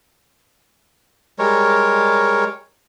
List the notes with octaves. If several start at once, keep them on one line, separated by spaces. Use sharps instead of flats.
G3 G#3 A#4 C#5